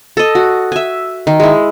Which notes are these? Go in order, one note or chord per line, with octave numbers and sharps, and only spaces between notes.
A4 D#5
F#4
E5 G#5
D#3
G#3 E4